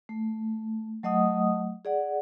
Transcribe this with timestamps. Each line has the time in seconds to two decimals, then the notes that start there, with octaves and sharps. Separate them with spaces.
0.09 A3
1.03 F#3 A3 D#5 F#5 D#6
1.85 G#4 D5 F#5